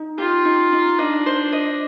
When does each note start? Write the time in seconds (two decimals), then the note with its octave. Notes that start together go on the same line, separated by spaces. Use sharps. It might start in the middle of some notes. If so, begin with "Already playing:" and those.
Already playing: D#4
0.18 F4 G4
0.45 D#4
0.73 D#4
0.99 D4 D#5
1.26 C5
1.52 D#5